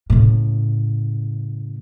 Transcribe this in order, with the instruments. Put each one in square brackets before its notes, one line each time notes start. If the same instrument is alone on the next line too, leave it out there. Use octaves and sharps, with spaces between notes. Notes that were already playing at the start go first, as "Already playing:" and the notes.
[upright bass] A2 C#3